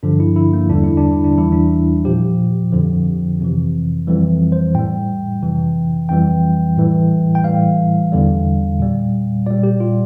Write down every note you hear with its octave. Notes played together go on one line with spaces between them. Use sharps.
G2 D3 F3 D4
E4
E4
A#3
E2 D3 G3 D4
E4
D4
E4
D4
E2 E3 G3 E4
D4
A#2 F3 G4
F2 D3 F3
F2 C3 E3
F2 E3 G3
C5
A2 G3 G5
F2 C3 E3
F2 E3 G3 G5
A2 E3 G3
G5
A2 E3 G3 F5
E2 D3 G3
A#2 G3
A#2 G3 D5
G4
F4